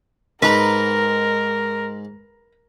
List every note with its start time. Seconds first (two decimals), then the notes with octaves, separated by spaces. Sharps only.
0.42 G#2 G#3 D#4 A#4 B4 A#5